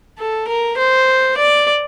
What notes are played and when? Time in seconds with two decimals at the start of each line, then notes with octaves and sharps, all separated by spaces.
0.19 A4
0.48 A#4
0.78 C5
1.38 D5